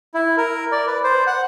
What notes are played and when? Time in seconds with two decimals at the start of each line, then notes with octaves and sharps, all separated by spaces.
0.14 E4
0.37 A#4
0.72 D5
0.87 B4
1.04 C5
1.27 F#5